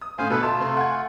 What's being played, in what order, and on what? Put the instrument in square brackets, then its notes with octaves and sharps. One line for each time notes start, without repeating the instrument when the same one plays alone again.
[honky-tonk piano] D#6
[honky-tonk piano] A2 D3 [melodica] C5 F5 G#5
[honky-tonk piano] B2 [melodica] A4 B4
[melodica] A3 F4 [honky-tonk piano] A5
[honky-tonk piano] C3 A4 C6
F#5 G#5 G#6